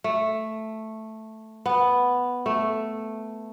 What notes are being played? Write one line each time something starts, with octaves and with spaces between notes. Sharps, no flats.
A3
B3
A3